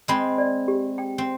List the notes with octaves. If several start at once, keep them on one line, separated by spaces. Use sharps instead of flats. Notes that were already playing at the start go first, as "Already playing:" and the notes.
G#3 C4 B5
D5
G4
G5
C4